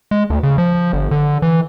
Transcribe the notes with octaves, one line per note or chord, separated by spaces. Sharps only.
G#3
D2
C#3
F3
G1
D3
E3